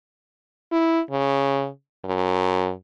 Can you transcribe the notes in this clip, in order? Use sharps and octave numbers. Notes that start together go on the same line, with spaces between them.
E4
C#3
F#2